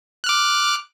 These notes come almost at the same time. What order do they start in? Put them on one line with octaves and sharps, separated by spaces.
F#6 F6 D6